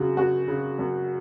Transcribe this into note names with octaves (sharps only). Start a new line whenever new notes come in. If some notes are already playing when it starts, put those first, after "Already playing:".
Already playing: F#2 C#3 F#4
F#2 F#4
C#3
F#2